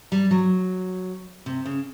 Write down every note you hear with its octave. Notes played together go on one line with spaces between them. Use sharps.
G3
F#3
C3
C#3